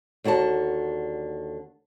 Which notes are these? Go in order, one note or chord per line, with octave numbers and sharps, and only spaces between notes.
D#2 D3 F#4 D5 A5